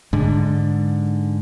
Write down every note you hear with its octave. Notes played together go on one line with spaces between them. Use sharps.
G#2 D3